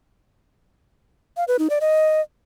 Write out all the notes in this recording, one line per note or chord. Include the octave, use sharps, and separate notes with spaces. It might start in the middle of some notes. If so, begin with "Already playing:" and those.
F5
B4
D#4
D5
D#5